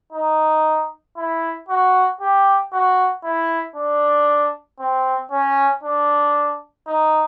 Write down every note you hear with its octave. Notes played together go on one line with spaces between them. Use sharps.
D#4
E4
F#4
G4
F#4
E4
D4
C4
C#4
D4
D#4